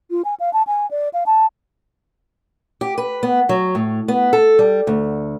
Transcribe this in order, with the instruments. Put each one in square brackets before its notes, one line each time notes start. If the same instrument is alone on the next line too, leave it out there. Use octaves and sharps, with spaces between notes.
[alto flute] F4
G#5
F5
A5
G#5
D5
F5
A5
[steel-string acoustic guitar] G4
B4
B3
F#3
A2
B3
A4
G3
D2